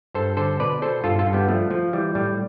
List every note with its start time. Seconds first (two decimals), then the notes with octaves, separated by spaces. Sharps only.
0.14 G2 A4 C5
0.37 D3 A4 C5
0.59 B2 B4 D5
0.82 B2 A4 C5
1.04 G2 F4 A4
1.19 F4 A4
1.26 G2
1.33 G3 B3
1.48 F3 A3
1.71 F3
1.93 E3 G3
2.15 A2 G3